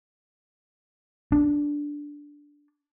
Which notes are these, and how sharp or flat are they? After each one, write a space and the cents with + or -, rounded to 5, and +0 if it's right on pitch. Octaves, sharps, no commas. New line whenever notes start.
D4 -5